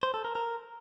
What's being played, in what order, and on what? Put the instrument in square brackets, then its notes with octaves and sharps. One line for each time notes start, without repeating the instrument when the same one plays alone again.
[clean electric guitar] C5
A4
A#4
A#4